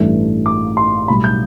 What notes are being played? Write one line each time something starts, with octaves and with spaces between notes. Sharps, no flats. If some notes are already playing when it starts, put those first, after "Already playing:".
Already playing: A1 G2 E3 A3
D6
C6
B1 A2 G3 B5
G6